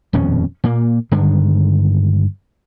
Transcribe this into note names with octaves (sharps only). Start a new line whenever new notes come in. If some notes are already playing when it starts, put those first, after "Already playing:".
D#1 F2 B2 C#4
A#2 A#3
G2 D3 D#3 G#3